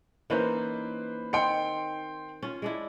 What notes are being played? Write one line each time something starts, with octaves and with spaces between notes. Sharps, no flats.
E3 A#3 C#4 D#4 B4 C5
D#3 C4 G5 C6 C#7
C#4 F4
G#3 D4 E4